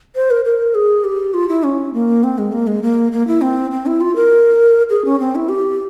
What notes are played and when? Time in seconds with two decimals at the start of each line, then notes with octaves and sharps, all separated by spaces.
0.15 C5
0.31 A#4
0.45 A#4
0.75 G#4
1.04 G4
1.34 F4
1.49 E4
1.63 C#4
1.94 A#3
2.24 C4
2.38 G#3
2.52 A#3
2.67 G#3
2.83 A#3
3.12 A#3
3.27 E4
3.42 C4
3.71 C4
3.86 E4
4.01 F4
4.16 A#4
4.90 G#4
5.05 C#4
5.20 C4
5.35 E4
5.49 G4